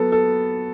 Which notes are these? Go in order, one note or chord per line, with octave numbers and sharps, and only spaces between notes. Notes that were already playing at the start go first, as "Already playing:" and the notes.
Already playing: F#3 B3 A4
A4